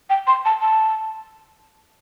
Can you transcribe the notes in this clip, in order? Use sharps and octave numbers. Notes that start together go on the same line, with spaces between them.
G5
C6
A5
A5